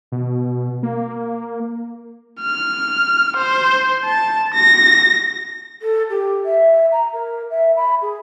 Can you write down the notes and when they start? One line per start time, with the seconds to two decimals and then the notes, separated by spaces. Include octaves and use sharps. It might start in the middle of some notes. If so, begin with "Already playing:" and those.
0.12 B2
0.83 A#3
2.41 F6
3.36 C5
4.04 A5
4.54 A#6
5.82 A4
6.10 G4
6.46 E5
6.92 A#5
7.13 A#4
7.51 E5
7.77 B5
8.02 G#4